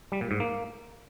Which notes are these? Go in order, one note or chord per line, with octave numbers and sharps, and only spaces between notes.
G3
A#2
G#2
A#3